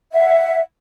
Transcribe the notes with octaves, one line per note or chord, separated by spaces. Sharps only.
E5 F#5